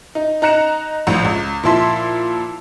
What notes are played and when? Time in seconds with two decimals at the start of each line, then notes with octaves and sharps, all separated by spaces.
0.15 D#4
0.42 D#4 A#5 F#6 C#7 E7
1.07 A#1 A2
1.25 C#2
1.63 A#2 F3 E4 A5 C6 B6